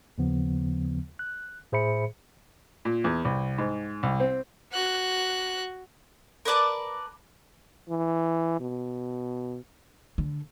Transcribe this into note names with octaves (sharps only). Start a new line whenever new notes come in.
D#2 C#3 F3 B3
F#6
A2 G#4 C5 E5 B5 C#7
A#2
E2
C2
G#2
C2
C4
F#4 F#6
A#4 B4 D5 A5
E3
B2
D3